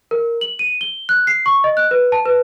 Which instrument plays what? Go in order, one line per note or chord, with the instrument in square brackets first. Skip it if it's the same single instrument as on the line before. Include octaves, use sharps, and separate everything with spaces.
[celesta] A#4
F#7
D#7
G7
F#6
C7
C#6
D#5
F#6
B4
A5
B4